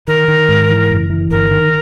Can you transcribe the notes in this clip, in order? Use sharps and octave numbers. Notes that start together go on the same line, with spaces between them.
D#3 A#4
D#3
G#2
E3
F#1
E3
G1 A#4
D#3